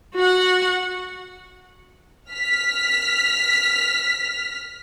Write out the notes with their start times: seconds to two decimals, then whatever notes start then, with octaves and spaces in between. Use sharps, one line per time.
0.15 F#4 F#5
2.33 F6 B6